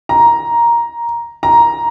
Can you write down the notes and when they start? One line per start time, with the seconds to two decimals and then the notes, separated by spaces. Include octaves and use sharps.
0.09 A#5
1.43 A#5